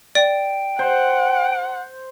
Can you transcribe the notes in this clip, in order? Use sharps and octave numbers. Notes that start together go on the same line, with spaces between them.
D5 G5
C5 F#5